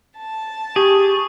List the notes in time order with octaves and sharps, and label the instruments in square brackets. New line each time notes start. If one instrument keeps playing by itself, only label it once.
[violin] A5
[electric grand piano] G4 [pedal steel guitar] G#4 [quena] C#6